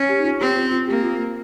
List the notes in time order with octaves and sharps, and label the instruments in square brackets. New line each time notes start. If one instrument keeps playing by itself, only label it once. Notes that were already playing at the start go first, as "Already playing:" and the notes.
Already playing: [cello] C#4
[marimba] G4
D#4
F4
[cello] C4 [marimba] G4
[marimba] F4
F4
[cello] A#3 [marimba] G4
[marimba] F4